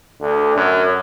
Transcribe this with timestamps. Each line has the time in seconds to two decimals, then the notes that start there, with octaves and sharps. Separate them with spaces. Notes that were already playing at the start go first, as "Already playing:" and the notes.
0.20 D2
0.56 F#2